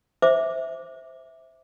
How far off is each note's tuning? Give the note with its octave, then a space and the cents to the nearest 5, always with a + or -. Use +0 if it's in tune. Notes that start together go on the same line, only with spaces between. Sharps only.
C5 +0 E5 -10 D6 +0